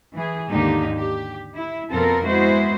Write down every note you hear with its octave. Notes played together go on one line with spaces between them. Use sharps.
E3 G#4
D#2 G#2 D3 A#3 D#4 G4
G4
E4
F2 B2 B3 C4 A4 A#4
G#3 B3 E4 F#4 C5